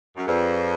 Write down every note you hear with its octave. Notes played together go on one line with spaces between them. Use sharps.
F#2
F2 G#4 B4 D5